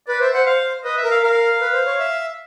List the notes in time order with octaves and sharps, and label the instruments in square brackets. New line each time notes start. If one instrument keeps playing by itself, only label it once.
[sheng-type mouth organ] B4 [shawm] D5
[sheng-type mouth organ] C5 [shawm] E5
[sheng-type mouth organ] C5 [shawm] F#5
[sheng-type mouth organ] C5 [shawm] F5
[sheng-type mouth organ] B4 [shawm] D#5
[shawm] E5
[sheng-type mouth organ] A#4
[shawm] F5
[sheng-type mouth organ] A#4 [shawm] F5
[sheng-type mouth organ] B4
C5
C#5
E5